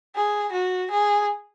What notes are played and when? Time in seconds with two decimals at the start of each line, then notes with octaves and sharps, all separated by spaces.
0.16 G#4
0.52 F#4
0.91 G#4